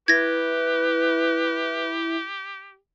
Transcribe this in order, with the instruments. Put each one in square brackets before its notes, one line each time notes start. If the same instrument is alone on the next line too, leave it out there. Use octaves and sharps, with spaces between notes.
[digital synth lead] E4 [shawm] G4 [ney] B4 [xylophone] G#6 A#6